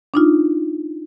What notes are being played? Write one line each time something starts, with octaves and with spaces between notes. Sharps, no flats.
D4 D#4 F4